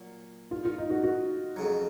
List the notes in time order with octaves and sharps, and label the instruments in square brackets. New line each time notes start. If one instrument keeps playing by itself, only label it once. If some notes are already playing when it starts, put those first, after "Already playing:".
Already playing: [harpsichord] A#2 F#3
[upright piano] F4
F4
D#4
F#4
F#4
[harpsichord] F2 C#3 F#3